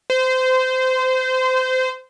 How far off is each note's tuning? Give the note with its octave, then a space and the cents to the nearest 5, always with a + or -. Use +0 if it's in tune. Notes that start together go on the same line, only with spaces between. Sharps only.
C5 -25